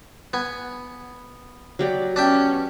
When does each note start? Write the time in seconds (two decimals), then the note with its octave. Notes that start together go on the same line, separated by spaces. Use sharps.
0.33 B3 G#5
1.79 F#3 G4 D5
2.16 B3 C#4 D4 E5 G5